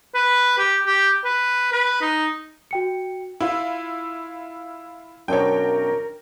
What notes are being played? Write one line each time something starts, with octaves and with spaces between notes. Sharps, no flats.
B4
G4
G4
B4
B4
D#4
F#4 G5 C#7
E4 F4
B1 F#2 B2 D4 A#4 C#5 G5